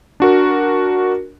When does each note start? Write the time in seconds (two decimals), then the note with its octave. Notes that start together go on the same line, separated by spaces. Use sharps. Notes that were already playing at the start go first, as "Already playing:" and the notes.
0.20 D4 F#4 A#4